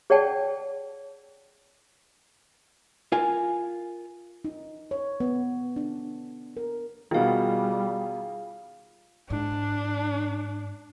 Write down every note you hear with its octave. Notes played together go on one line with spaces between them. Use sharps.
G#4 C#5 D5 F#5 G5 A5
F4 A#4 G#5
D#4
C#5
B3
D4
A#4
B2 D#3 G3 F4 G#4 F5
G#2 D4